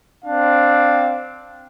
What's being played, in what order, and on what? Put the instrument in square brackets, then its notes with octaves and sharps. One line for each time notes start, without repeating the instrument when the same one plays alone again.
[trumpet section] C4 D4 F5